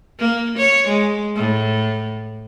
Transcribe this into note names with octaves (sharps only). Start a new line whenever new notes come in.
A#3
C#5
G#3
A2